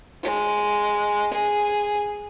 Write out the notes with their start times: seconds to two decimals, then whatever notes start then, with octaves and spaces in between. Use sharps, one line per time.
0.23 G#3
1.34 G#4